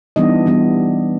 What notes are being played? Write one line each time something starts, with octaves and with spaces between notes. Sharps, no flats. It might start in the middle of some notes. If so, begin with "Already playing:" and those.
E3 G3 B3 D4 D#4 D#5
E3 G3 B3 D4